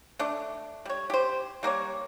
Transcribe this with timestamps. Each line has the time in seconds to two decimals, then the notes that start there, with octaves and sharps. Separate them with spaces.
0.19 A3 D4
0.85 G3 C#5
1.10 G4 C5
1.63 G3 A#3 G#4 C#5